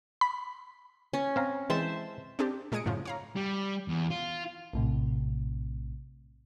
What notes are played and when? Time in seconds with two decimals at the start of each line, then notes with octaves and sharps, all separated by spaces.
0.21 B5
1.13 C#4
1.36 C4 F5 A#5
1.70 E3 G#3 C4 C5 E5 A5
2.39 C4 D4 G4
2.72 A#2 G#3 G#5 D#6 C#7 D7
2.86 F#2 A2 C#3 F3
3.05 C#5 F5 A#5
3.36 G3
3.88 E2
4.10 F4
4.73 A#1 A2 C3